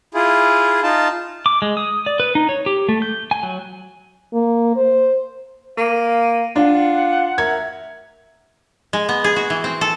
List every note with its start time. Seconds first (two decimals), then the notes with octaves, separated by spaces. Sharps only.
0.14 E4 F4 G#4
0.83 D#4 F4 A5
1.46 D6
1.62 G#3
1.77 D#6
2.06 D5
2.20 B4
2.35 D#4
2.49 C#5
2.66 G4
2.89 A3
3.02 G6
3.31 G#5
3.43 F#3
4.33 A#3
4.76 C5
5.77 A#3 F5 D#7
6.56 D4 F4 F5 F#5
7.38 A#4 E5 G#6
8.93 G#3
9.09 B3
9.24 G#4
9.36 F#4
9.50 E3
9.64 C4
9.81 A4